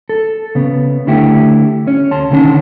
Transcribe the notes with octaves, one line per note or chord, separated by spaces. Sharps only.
A4
C#3 B3
D3 A3 E4 G4
C#4
D2 A5 C6
C#2 A#2 D3 D#3 C#4 A5